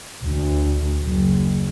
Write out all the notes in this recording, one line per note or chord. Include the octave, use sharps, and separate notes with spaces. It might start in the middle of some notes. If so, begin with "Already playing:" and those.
D2
F#1